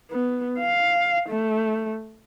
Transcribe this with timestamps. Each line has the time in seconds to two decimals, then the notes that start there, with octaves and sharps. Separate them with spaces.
0.11 B3
0.58 F5
1.29 A3